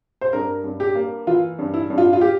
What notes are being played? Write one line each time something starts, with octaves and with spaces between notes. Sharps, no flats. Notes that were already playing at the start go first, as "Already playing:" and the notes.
C5
G2 A#4
G2
G4
A#3
E3 F4
G2
E4
G2
F4
F4
G4